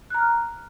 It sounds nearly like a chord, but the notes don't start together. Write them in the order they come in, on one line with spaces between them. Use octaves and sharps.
F#6 A#5 F6